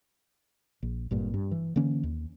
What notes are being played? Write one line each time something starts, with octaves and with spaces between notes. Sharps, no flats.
A#1
G#1 G2 A#2
G2
E3
D3 E3 A#3 C#4
D#2